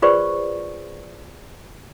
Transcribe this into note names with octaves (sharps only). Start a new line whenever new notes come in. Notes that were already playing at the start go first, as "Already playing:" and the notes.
F4 G#4 B4 C5 D5 C#6